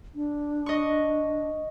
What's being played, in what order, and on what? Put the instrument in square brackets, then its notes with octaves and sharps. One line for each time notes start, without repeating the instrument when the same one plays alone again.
[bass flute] D4
[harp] D#5 C#6